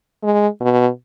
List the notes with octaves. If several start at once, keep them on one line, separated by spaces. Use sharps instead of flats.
G#3
B2